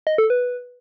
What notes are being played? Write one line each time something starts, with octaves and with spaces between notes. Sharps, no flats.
D#5
A4
B4